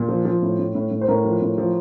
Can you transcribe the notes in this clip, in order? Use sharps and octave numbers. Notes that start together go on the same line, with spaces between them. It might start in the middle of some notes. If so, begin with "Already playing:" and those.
Already playing: A#2
F3
F3
A2
A2
A2
A2
C5
A2 A#4
F3
A2
F3